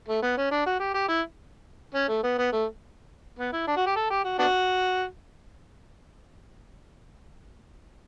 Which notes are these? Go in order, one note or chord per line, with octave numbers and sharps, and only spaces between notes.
A3
B3
C#4
D4
F#4
G4
G4
E4
C#4
A3
B3
B3
A3
B3
E4
D4
F#4
G4
A4
G4
F#4
B3 D4 F#4